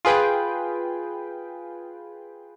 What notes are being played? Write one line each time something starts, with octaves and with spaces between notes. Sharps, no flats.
F4 G#4 B4 G5